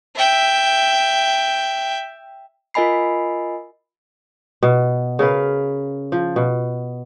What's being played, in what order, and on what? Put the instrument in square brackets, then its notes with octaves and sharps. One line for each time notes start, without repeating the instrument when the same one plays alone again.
[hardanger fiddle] E5 G5
[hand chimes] F4 A#4 D#5 G#5 B5 C7
[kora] B2
C#3 A#4 B4 F5
F3
B2